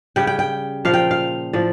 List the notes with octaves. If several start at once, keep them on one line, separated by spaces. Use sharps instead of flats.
C#3 G3 G5
G5
G5
A#2 F3 F5
G5
F5
A2 F3 D5